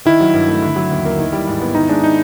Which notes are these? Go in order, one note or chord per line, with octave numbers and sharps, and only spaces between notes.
D#3 E4
F#3
G2
A3
D3
F#3
D#2
A#3
D#3
G3
G#2
B3
D#3 D#4
G#3 D4
D#4